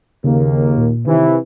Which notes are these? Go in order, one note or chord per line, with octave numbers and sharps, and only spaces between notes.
D#2 C#3 A#3
A#2
C3 D#3 E3